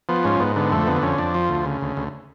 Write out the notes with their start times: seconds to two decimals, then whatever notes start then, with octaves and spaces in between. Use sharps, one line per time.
0.09 F3 B3
0.24 G#2 C#4
0.40 G#2 B3
0.56 D3 B3
0.72 F2 A3
0.87 D3 B3
1.02 F2 C#4
1.18 F2 D4
1.34 F3
1.49 D2
1.65 C#3
1.81 D2
1.97 D2